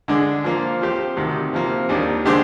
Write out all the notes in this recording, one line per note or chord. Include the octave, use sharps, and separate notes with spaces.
D3 G#3 D4
F3 A#3 F4
F3 C4 G4 C5
D2 C3 D#3
C3 F3 A#3
D#2 D#3 G3 D4
D3 G#3 D4 G4 C5